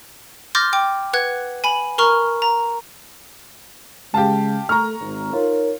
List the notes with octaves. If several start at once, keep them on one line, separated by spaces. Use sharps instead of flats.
C6 D6 F6 G6 A6 A#6
G5 D6
B4 F#5 F#6 G#6
G#5 B5 F#7
A#4 A#5 C#6 F6
A#5
C#3 G#3 G4 F5 A5
A3 A#5 C#6 F6
G#1
D#4 F4 A#4 C#5